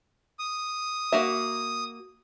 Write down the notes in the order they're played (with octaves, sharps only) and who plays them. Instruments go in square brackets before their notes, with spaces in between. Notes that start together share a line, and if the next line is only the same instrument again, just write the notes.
[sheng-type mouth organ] D#6
[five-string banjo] A#3 F#4 E5